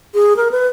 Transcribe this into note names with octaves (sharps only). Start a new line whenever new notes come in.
G#4
A#4
B4